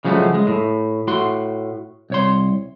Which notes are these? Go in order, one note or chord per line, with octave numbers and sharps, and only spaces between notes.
C#3 F3 F#3 G#3 A3
G#3
A2
A2 F#4 C6
C2 C#5 C6